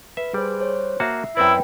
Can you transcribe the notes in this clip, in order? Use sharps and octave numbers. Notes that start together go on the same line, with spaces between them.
B4 E5
G3 G#4 C5
C5 C#5
A#3 F#4 E5 A5 C7
F#2 C4 E4 B4 D5 G5